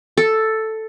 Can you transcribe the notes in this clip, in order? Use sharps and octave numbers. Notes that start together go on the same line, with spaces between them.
A4